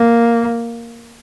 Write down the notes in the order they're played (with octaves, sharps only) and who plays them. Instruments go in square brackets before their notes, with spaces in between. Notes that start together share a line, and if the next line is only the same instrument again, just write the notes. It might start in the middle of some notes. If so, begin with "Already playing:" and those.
Already playing: [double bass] A#3